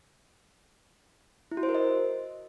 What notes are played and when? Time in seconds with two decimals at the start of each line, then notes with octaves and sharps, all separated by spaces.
1.51 E4
1.57 F#4
1.63 C5
1.69 A#4
1.75 D#5